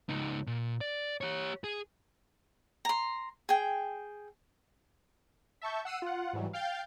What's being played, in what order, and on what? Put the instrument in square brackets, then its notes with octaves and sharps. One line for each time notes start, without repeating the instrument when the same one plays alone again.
[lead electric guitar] C#2 D#4
A#2
D5
G4 C#5
G#4
[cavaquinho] A#5 C6
G#4 G5
[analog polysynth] E5 A5 C#6 G6
F#5 E6 C7 D#7
F4 F#5
G#2 E3 F#3 G3
F5 G5 F6 G6 A6